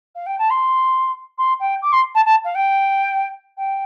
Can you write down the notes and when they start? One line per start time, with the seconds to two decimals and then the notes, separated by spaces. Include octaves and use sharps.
0.15 F5
0.26 G5
0.38 A5
0.50 C6
1.38 C6
1.59 G5
1.82 D6
1.92 C6
2.15 A5
2.25 A5
2.44 F5
2.55 G5
3.57 G5